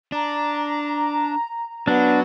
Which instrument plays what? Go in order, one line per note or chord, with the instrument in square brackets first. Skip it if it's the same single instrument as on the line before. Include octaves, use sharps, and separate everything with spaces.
[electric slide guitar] D4 [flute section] A#5
[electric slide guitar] F#3 [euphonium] B3 [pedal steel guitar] D4